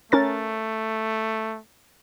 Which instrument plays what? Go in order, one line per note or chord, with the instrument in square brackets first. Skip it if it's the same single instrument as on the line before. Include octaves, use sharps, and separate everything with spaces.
[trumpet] A3 [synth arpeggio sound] C#4 A#4 A6